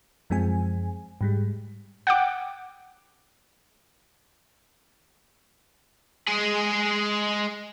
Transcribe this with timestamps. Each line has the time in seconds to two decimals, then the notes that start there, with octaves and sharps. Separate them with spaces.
0.30 F#2 F3 G#3 C4 G#5
1.21 G#2 G3 G#3
2.07 F#5 G5 D6
6.28 G#3 G#4